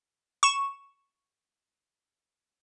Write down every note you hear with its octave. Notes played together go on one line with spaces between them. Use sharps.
C#6 E7